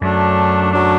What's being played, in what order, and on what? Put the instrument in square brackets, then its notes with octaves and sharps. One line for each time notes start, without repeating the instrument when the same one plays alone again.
[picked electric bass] F#2 [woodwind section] F#3 A3 D4
[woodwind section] F#3 A3 D4